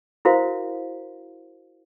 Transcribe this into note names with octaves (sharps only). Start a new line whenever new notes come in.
E4 F#4 A#4 C5 F5